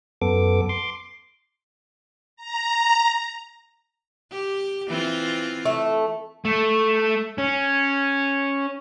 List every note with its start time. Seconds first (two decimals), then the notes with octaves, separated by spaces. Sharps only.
0.22 F#2 B3 A4 D6
0.69 C6 D6
2.37 A#5
4.32 G4
4.89 E3 C4 F4
5.65 A3
6.45 A3
7.38 C#4